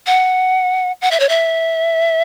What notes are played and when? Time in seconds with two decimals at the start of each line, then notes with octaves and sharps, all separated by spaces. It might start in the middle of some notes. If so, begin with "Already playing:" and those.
0.07 F#5
1.02 F#5
1.11 E5
1.20 C#5
1.29 E5